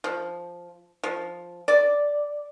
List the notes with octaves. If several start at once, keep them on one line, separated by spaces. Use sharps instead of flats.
F3
F3
D5